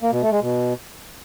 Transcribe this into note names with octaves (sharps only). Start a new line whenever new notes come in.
A#3
B2
A3
G#3
B2